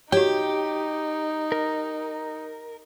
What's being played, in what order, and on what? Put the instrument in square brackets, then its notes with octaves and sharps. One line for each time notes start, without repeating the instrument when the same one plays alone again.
[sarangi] D#4 [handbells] F#4 C#5 [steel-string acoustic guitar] G4 [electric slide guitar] G5
[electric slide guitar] A#4